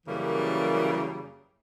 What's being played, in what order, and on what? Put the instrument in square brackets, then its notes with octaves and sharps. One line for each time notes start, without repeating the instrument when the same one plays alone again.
[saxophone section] F#2 C#3 E3 G3 A#3